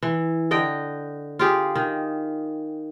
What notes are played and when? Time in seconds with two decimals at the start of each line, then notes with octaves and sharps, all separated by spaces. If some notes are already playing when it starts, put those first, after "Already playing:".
0.03 E3
0.51 D3 D#5 G5
1.39 F4 G4 G#4
1.75 D#3